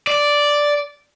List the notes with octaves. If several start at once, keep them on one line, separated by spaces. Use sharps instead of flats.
D5